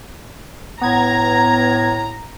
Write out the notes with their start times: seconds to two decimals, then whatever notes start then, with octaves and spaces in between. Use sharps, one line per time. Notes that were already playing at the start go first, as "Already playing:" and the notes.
0.81 A2 B3 A#5 G#6